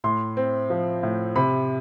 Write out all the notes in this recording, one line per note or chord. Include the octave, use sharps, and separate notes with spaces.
A2 C6
C4
F3
A2
C3 B5